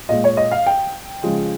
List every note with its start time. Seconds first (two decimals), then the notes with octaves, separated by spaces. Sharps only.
0.09 A#2 G#3 D#5
0.24 C#5
0.37 D#5
0.51 F5
0.66 G5
1.23 C#3 F3 G#3